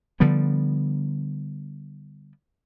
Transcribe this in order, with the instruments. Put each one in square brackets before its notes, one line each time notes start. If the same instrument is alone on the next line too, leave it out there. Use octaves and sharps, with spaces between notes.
[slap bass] D3 F3 G3 B3